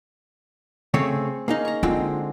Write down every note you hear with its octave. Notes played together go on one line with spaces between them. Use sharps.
C#3 A3 C4 G#4 C#5
A#3 C#4 D#4 G#4
A#5 C#6
D3 G#3 C4 F4